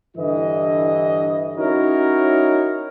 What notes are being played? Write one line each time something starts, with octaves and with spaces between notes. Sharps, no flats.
G2 D3 E3 E4 D#5
C#4 D#4 E4 F#4 A#4 C#5